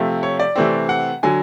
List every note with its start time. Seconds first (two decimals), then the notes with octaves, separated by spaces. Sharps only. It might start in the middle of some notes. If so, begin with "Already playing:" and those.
Already playing: C3 F3 A3
0.23 C#5
0.39 D5
0.56 C3 E3 A3 C4
0.89 F#5
1.23 D3 F#3 G#5